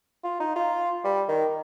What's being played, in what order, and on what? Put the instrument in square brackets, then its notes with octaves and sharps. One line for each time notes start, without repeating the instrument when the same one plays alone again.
[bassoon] F4
D#4
F4
G3
D#3